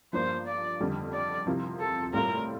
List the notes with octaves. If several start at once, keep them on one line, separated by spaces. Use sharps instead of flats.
G2 F3 A#3 D4 C5
D5
F2 D3 G3 C4
D5
C3 F3 C4 E4 A#4
A4
A2 G3 C4 F4 A4 A#4